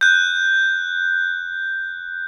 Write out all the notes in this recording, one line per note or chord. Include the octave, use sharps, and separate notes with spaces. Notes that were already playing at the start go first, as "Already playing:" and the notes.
F#6 G6